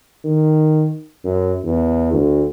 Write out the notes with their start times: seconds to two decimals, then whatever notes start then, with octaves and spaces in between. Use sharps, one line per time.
0.25 D#3
1.25 F#2
1.64 E2
2.13 D2